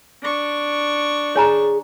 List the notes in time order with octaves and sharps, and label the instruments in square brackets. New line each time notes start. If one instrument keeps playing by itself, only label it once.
[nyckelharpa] D4 C#6
[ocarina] G#4 [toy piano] C#5 G#5 A#5